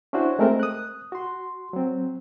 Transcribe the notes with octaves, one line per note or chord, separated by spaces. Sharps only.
C#4 D4 E4 F#4 C5
G#3 A3 C4 A#4 C5
D#6 F#6
F#4 C6
F#3 C4